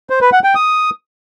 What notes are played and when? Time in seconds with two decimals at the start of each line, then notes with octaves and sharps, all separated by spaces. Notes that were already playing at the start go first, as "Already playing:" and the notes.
0.10 C5
0.21 B4
0.32 F#5
0.44 G5
0.55 D#6